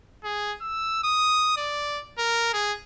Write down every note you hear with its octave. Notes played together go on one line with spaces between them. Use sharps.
G#4
E6
D#6
D5
A#4
G#4